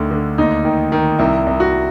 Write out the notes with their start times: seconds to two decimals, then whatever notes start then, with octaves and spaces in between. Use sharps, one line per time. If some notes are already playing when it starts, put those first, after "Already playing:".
Already playing: D2 D3 D#3
0.11 D3
0.38 D#2 D#4
0.65 D#3
0.92 D#3
1.19 C2 E4
1.46 C2
1.60 F#4